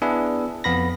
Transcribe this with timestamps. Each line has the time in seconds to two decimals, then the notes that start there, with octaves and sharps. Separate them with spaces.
0.02 B3 D4 E4 G#4 B4 E5
0.64 F2 B3 B5 A#6